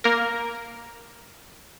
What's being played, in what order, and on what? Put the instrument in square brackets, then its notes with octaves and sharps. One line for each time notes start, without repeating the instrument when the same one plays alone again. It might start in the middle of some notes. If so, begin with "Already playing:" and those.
[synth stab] A#3 A#4